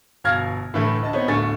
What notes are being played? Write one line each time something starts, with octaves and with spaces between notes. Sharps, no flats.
G1 B2 F5 F6 G#6 A#6
A2 D3 E3 A3
D2 D#5 A5
B3 C4 D#4 C#5
D1 D3 A3 G#5 C#6 A6